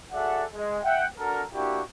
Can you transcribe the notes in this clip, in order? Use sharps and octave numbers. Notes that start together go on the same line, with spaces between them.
F#4 G#4 A4 D5 E5 F#5
G#3
E5 F#5 G5
D4 F#4 A4 A#4
A#3 D4 E4 F#4 G4